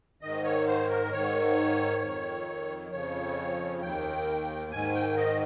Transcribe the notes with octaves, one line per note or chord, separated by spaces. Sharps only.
G#2 D#3 D#5
C#5
C5
A#4
G#2 D#3 C#5
F2 D#3
F2 C#3 F3 C#5
D#2 D#3 G5
G#2 D#3 G#5
G5
D#5